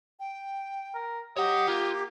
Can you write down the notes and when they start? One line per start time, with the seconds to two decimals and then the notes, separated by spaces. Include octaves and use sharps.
0.20 G5
0.95 A#4
1.37 G4 C#5 D#5 F#5
1.68 A#3 F4